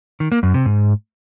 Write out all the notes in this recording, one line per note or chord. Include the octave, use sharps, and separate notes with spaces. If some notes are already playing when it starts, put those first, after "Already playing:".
D#3
A#3
F#2
C3
G#2